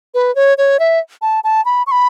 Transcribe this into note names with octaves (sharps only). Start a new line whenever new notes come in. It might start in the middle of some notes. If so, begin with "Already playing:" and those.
B4
C#5
C#5
E5
A5
A5
B5
C#6
B5